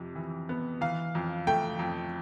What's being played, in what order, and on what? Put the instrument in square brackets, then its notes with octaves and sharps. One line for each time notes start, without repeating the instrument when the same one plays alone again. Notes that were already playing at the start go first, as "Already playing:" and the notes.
Already playing: [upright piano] F2 C3
E3
B3
E3 F5
F2
A3 G5
F2